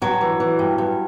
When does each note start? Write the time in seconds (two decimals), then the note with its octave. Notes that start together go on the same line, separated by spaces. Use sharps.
0.02 G2 F#3
0.21 E3
0.40 E3
0.59 G2
0.78 G2